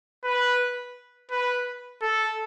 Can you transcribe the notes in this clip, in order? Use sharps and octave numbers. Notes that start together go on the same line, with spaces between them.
B4
B4
A4